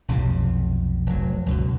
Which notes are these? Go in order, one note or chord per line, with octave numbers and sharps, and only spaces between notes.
B1 F2 A2 C3
F1 F#3
C#2 F#2 B2